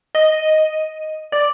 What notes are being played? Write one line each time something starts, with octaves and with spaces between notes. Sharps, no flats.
D#5
D5